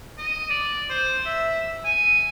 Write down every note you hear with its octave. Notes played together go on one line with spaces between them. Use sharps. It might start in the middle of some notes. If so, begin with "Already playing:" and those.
D#5
D5
C5
E5
G#5